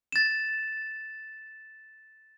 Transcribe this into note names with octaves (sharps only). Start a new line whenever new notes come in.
A6 E7